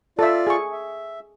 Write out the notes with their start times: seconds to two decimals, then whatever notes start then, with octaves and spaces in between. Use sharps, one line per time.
0.19 F4 A4 D5 E5
0.47 G#4 C#6
0.72 E5